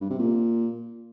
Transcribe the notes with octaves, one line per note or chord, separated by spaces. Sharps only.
G2
C3
A#2